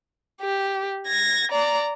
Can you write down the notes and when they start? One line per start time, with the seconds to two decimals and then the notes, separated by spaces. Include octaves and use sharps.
0.41 G4
1.07 G#6 A#6
1.52 D5 A#5